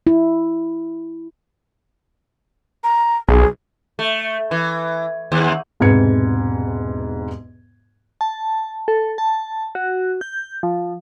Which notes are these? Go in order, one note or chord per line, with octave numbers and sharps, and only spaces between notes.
E4
A#5
B1 G#4
A3
E3
D#2
E1 G#2 C3 B4 G#6 C#7
A5
A4
A5
F#4
G6
F3